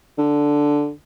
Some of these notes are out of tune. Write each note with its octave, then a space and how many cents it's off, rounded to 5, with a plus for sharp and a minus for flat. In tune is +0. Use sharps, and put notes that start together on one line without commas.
D3 +0